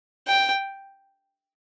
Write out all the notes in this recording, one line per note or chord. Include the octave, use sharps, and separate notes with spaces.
G5